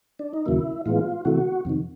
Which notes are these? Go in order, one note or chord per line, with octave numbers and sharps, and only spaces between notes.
D4
D#4
D#2 C#3 F#3 A#3 E4
A2 E3 G#3 B3 F4
C3 E3 A3 F#4
F2 C3 D#3